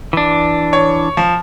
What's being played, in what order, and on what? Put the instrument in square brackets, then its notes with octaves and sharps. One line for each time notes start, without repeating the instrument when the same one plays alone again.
[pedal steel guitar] E3 D4
[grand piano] C#5
F3